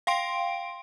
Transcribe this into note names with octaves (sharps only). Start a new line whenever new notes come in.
F5 G5 C6 D7